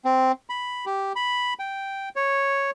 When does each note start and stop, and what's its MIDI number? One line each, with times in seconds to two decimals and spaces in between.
0.05 0.32 60
0.50 0.85 83
0.86 1.13 67
1.16 1.54 83
1.59 2.09 79
2.16 2.71 73